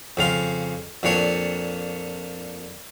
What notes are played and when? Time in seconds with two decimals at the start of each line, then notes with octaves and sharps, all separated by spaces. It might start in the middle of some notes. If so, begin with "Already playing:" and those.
0.17 F2 C#3 F5 C6
1.03 F2 A#2 D4 C#5 C#6